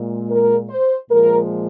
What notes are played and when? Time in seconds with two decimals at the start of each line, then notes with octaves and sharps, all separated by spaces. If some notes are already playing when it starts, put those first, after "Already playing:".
Already playing: A#2 G#3
0.30 A#4
0.70 C5
1.09 A#2 F3 G#3 A#4